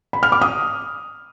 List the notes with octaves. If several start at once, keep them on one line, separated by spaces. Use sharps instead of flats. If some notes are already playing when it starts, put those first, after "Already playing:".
B5
F6
D6
D#6